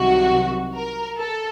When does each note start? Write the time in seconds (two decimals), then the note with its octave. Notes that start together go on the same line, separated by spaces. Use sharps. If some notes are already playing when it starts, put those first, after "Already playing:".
Already playing: C2 C3 D#3 F#3 F#4
0.74 A#4
1.18 A4